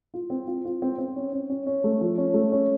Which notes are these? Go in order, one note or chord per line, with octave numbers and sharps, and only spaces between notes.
F4
C4
F4
F4
C4
C4
C#4
C#4
C#4
C#4
A3
F3
C#4
A3
C#4